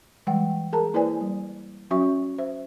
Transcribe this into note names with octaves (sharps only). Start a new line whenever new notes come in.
E3 G3 G#3 F#5 G5
G#4 A#4 A5 A#5
A#3 E4 B4 C5 D5 G#5
G3
F#3 C#4 F#4 E5 C#6
C5 E5